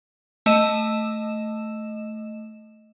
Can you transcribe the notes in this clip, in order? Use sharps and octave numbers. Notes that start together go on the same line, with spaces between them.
A3 D#5 E7